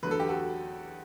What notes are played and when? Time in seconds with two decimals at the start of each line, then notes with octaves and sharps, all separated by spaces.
0.03 E2 D3 F#3 A3 B4
0.11 A4
0.20 G4
0.28 F#4 A4